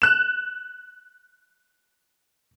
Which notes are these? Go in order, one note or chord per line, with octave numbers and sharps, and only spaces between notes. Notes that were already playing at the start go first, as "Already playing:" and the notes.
F#6 E7